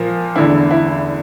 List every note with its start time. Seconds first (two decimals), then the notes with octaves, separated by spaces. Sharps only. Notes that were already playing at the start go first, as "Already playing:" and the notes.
Already playing: A#2 F3 A#3
0.36 E2 D3 A3 E4
0.71 E4